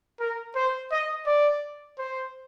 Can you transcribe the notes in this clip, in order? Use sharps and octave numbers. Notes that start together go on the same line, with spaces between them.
A#4
C5
D#5
D5
C5